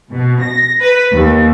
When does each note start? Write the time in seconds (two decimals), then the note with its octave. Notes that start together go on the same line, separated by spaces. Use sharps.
0.12 B2
0.42 A#6
0.81 B4
1.12 D#2